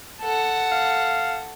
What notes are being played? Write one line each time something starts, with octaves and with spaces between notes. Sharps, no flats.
A4 F#5
F5